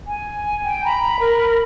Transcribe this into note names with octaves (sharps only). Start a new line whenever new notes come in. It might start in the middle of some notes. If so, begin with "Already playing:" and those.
G#5
G5
A#5 B5
A#4